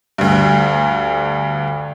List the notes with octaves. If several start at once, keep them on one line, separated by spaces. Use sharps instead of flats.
D2 G2